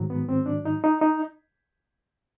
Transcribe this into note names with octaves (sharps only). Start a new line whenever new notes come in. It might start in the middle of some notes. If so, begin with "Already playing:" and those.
Already playing: G#2 D#3 F#3
B3
C4
D4
D#4
D#4
D#4